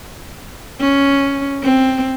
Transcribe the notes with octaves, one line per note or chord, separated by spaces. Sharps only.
C#4
C4